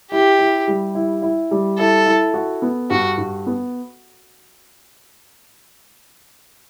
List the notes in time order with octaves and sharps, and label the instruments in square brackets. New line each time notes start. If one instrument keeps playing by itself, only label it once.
[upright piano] E4 [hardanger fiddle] G4
[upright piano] E4
G3
E4
E4
G3
[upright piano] E4 [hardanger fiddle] A4
[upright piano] E4
F#4
B3
[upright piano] G2 [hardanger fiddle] F#4
[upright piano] G2
B3